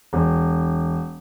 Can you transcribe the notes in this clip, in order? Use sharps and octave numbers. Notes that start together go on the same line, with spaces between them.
E1